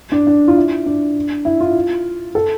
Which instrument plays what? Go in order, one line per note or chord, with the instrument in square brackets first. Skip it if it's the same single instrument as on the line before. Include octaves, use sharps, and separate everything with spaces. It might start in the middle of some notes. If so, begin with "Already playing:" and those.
[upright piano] D4
D4
F4
E4
D4
E4
F4
A4